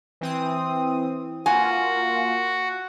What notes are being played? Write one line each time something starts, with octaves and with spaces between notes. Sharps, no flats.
E3 C4 D#6
A#3 F4 F#4 G#5